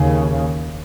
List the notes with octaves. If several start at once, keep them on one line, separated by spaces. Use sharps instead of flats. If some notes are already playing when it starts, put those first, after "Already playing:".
Already playing: D#2 C#3